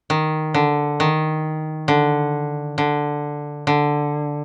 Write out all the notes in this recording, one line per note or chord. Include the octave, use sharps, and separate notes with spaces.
D#3
D3
D#3
D3
D3
D3